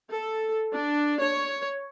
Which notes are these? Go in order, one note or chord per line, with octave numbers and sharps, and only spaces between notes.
A4
D4
C#5